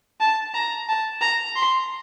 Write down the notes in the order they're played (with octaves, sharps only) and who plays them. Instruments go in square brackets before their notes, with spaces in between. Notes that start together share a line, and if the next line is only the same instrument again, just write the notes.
[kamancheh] A5
A#5
A5
A#5
C6